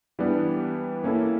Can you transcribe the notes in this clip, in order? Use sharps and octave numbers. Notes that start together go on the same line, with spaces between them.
E3 G3 B3 D4 G4
A#3 C#4 E4 A4